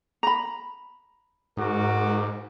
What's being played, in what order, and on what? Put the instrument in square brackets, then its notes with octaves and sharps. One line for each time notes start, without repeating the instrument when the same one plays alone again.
[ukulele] A#5 B5
[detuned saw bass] G#2 [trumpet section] F#4 A#4 D6